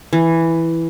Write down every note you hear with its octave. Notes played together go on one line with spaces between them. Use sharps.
E3